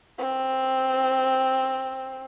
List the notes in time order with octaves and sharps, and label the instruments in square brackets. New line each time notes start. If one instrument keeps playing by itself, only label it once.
[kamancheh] C4